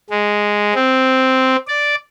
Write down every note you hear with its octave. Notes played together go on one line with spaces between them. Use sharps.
G#3
C4
D5